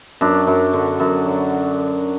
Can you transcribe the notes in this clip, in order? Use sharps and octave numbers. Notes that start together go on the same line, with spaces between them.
F#2 D4
F#2
D3
F#2
F#3